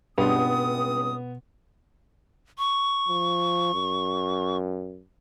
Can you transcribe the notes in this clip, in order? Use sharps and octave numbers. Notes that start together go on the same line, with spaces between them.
C#2 G2 B2 B3 C4 C6 D#6 F7
C#6
F3
F#2